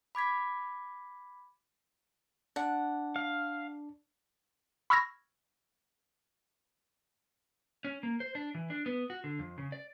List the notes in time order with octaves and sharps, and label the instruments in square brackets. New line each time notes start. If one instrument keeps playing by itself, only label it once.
[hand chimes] B5 D6 G#6 B6
[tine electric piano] D4 [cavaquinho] F#5
[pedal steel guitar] F5
[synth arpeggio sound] B5 C#6 E6 F6 G#6 A#6
[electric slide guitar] C#4
A#3
C5
D4
E3
D4
B3
F#4
D3
F2
C#3
D5